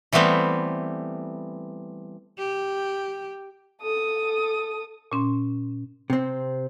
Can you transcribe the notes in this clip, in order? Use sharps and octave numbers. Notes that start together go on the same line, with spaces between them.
E3 G3 A3 B3 C4
G4
A4 D#6
A#2 C#4 C6
C3 C4